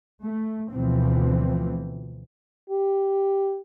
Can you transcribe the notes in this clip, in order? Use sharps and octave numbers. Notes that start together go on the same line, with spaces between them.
A3
D2 B2 E3 F3 C4
G4